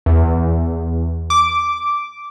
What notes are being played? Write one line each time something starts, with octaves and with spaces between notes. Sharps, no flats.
E2
D6